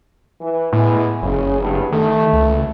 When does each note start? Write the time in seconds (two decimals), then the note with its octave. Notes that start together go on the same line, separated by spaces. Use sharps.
0.40 E3
0.73 A2 G#3 B3 E4
1.22 F#1 C#3
1.59 E2 G2
1.92 D#3 A3
2.33 C#2